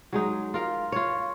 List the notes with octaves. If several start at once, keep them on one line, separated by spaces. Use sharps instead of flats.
F#3 G#3 D#4
F4 A#4 F5
F4 C#5